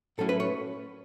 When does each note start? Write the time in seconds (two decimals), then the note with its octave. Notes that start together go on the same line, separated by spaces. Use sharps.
0.18 A2 F#3 A3 C#4 E4 A4
0.29 B4
0.40 C#5